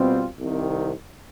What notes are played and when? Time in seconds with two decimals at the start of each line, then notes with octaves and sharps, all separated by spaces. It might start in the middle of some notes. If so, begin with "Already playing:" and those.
Already playing: B2 G3 C4 F4
0.39 C2 C3 D#3